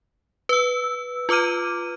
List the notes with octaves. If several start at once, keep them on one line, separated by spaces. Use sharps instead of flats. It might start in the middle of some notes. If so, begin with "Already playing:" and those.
B4 E6
F4 B4 D6 F6 D#7